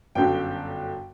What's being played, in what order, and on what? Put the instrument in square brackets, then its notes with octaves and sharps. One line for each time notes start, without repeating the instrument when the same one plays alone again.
[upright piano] G1 F#2 D3 G5